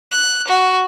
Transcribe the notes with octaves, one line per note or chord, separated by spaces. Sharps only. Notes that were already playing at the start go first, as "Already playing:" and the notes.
F#6
F#4